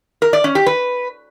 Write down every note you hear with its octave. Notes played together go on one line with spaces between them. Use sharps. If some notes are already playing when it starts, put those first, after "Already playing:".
A#4
D5
C#4
G4
B4